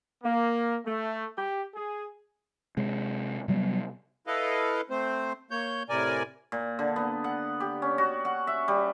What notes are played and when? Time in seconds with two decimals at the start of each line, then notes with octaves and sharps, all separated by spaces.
0.24 A#3
0.86 A3
1.37 G4
1.75 G#4
2.77 C3 G#3
3.48 C3 F#3 G3 B3
4.27 E4 A4 B4 D#5 F5
4.90 A3 C4 C5
5.51 A#3 C#5 G6
5.89 A2 C3 A#4 D5 G#5
6.52 A#2
6.79 D3
6.96 B3
7.24 F#5
7.60 G4
7.82 C#4
7.98 F#4
8.25 F#5
8.47 E5
8.68 G3